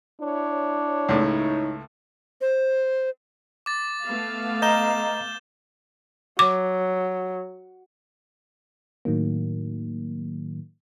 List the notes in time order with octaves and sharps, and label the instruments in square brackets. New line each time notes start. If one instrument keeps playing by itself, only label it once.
[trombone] D4 [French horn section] E4 C#5
[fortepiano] C#2 A2 [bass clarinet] D#4
[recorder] C5
[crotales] D6 A6
[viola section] A3 B3 F5
[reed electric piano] D#5 A#5 [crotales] G6 E7 G7
[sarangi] F#3 [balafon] D6
[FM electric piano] A2 D#3 F#3 A#3